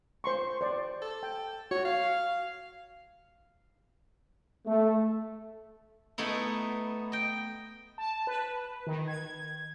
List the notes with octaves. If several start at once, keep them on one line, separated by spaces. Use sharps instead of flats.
C5 C6 C#6
C5 D5
A4
G5
F#4 C#5
F5
A3
A3 B3 D#4 E4
D#5 G5
A5
B4
D#3
G#6